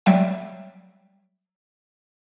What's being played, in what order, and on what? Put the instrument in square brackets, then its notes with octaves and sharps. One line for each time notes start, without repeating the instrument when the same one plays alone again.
[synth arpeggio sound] F#3 G3 A3 E5 G5